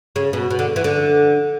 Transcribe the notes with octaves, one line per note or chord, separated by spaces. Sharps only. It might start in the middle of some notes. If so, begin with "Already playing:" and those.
C#3
B2
B2
D3
E3
D3